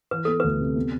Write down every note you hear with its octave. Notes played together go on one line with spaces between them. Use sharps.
E3 B4
B3 A4
D2 B4
C3
B3